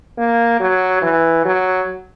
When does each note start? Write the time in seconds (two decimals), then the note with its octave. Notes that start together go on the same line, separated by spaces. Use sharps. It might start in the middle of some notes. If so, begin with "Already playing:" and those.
0.18 A#3
0.60 F#3
1.02 E3
1.45 F#3